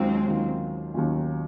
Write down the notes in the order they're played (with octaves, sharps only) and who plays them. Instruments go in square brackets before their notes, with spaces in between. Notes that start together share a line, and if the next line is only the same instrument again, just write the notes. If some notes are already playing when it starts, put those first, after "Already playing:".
Already playing: [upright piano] D#2 D#3 F#3 C#4 F4 [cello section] G#3 C4
[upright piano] D#2 D#3 F#3 C#4 F4
D#2 D#3 F#3 C#4 F4